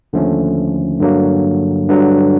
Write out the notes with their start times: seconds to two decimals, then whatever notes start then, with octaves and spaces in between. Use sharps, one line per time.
0.13 D#2 D3 F3 A3 C#4
1.00 G2 D3 F#3 A#3
1.88 G2 D3 F#3